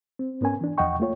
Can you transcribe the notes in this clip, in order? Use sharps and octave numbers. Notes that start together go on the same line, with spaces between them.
C4
G#2 B3 C#4 A#4 G#5
E3 D4
E2 F3 D#5 F#5 G5 C#6
A3 A#3 F4 C#5